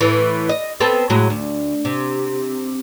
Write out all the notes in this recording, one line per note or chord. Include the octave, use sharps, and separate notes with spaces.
A2 E3
D#5
B3 C4 A4
A2 F#3 G#3
D2
C3